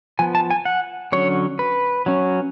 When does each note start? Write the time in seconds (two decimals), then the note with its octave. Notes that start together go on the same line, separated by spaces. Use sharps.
0.19 F3 B3 G#5
0.35 A5
0.51 G#5
0.65 F#5
1.12 D3 F#3 C#4 C#5
1.59 B4
2.06 F#3 C#4